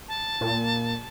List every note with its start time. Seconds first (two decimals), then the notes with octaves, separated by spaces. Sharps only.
0.08 A5
0.41 A#2